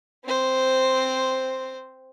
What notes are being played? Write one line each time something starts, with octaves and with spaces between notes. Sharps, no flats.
C4 C5